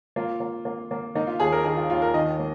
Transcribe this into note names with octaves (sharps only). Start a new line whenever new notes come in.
A#3 F4
A#3
A#3
A#3
A#3 D#4
F4
D#2 G#4
A#4
D#3 G#4
F4
D#2 F4
A#4
D#3 D#5
A#3